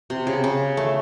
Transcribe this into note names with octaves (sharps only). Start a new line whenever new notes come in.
C3
C#3
C#3
A3